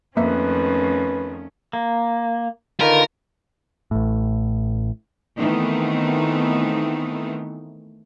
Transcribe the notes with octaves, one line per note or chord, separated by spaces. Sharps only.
F2 D#3 A3 A#3 C#4 B4 E5
A#3
D3 D#3 F4 A#4 B4
A1 A2
D#3 E3 A3 B3 C4 D#4